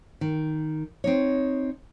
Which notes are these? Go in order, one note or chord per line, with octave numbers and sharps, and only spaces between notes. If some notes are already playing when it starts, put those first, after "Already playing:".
D#3
C4 D#4 C#5